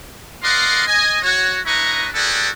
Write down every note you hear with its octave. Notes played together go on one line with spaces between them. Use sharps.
A#4 D5 D#5 F5 F#5 C6
D#5 G#5
F#4 C#5
D4 E4 B4 D#5 A#5 C#6
F#4 G#4 A4 B4 D5 G5